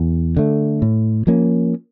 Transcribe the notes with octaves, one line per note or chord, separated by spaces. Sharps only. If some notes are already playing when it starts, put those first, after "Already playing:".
Already playing: E2
D3 A3
A2
F3 A#3 C#4